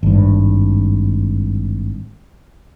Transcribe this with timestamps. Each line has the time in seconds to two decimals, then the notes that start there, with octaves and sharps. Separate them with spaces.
0.03 G#1 G2